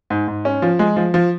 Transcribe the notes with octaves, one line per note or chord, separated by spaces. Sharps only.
G#2
G#2
C#4
F3
G#3
F3
F3